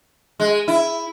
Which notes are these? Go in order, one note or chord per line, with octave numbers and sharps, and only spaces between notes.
G#3
E4